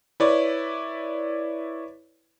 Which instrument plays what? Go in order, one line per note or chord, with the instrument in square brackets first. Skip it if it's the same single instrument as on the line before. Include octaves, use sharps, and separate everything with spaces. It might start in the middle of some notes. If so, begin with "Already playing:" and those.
[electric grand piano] E4 B4 C#5 D5